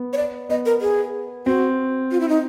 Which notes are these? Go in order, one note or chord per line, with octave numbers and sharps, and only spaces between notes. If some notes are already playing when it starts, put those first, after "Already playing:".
Already playing: B3
C#5
D5
B3 D#5
A#4
G#4
C4 F#4
F4
E4
D#4